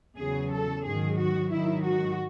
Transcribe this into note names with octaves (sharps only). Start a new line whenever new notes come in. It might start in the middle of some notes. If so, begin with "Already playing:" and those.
E2 C#3 F#3 G#4
A4
G#2 D#3 F#3 G#4
F#4
G#2 D#3 F#3 E4
F#4